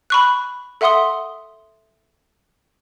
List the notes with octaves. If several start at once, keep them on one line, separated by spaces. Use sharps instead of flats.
B5 C#6 F#6
A4 E5 F#5 C6 D#6 G7